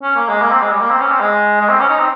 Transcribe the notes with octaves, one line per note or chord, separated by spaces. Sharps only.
C#4
A#3
G#3
A#3
C4
G#3
G3
A#3
C4
C#4
C4
G#3
G#3
C4
C#4
D#4
C4